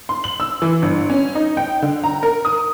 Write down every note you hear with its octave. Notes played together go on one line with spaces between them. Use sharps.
C6
F#7
E6
E3
G1
C#4
D#4
G5
D3
A#5
A#4
D#6